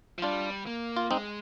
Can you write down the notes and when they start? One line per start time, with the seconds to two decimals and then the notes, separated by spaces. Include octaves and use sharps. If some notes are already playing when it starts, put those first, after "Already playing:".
0.18 F3
0.22 G3 D4 F4
0.67 A#3
0.97 F4
1.11 G#3 C4 D#4